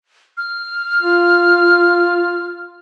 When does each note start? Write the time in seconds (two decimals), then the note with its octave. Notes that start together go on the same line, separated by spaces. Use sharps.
0.37 F6
1.02 F4